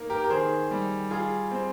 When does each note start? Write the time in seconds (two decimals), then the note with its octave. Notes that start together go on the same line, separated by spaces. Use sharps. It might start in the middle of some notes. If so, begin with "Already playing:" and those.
Already playing: A#3 D#4
0.10 G4 A#4
0.24 A#4
0.30 D#3 G#4 C5
0.71 G3
1.10 F4 G#4
1.51 C4